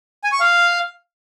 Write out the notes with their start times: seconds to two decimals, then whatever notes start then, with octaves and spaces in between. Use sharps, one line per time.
0.24 G#5
0.32 C#6
0.40 F5